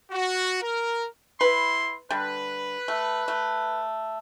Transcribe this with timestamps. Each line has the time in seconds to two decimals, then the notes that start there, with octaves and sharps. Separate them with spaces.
0.11 F#4
0.62 A#4
1.41 E4 B4 C6
2.10 D3 G3 B4
2.88 A3
3.28 A3